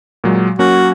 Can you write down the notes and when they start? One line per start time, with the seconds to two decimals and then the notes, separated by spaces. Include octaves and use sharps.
0.24 A#2 F#3 G#3
0.59 F#3 A#3 C#4 F#4